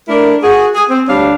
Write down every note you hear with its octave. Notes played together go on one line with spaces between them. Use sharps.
A3 D4 E4 A#4
F#4 G#4
G#4
C4
D2 G3 D4 C#5 F5